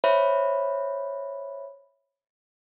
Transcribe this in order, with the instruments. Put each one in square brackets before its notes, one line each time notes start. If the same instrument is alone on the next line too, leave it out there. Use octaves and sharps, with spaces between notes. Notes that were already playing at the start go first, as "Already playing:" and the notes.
[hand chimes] C5 C#5 E5 B5